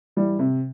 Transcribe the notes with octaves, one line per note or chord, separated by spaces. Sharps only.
E3 G3
C3